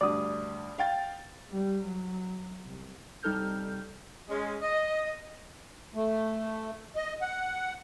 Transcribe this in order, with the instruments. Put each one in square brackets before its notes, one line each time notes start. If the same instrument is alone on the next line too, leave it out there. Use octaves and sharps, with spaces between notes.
[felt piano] D2 G2 [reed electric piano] D5 D#6
[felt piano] F5 G5 A6
[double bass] G3
F#3
C2
[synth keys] C2 G3 D#4 A4 F6 G6
[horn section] G#3 C#4
D#5
[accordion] A3
D#5
F#5